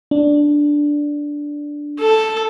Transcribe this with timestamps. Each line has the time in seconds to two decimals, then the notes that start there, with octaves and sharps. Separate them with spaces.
0.11 D4
2.00 A4